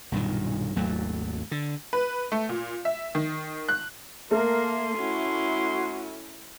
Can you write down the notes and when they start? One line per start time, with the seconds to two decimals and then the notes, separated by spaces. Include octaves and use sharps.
0.12 B1 G2 A#2 D#3
0.76 G#1 D#2 F#3 A3
1.51 D3
1.93 B4
2.32 A3
2.49 A#2
2.85 E5
3.15 D#3
3.69 F#6
4.31 A3 A#3 A#4 C6
4.98 C#4 E4 F#4